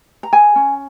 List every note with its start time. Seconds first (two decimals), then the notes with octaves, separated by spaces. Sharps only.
0.23 A#5
0.33 G#4 G#5
0.56 C#4